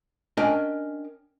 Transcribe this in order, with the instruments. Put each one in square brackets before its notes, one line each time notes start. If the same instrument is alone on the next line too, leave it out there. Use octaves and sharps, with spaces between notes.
[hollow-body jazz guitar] C#4 D4 A#4 D#5 G5 G#5